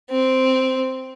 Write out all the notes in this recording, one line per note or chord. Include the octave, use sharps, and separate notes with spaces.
C4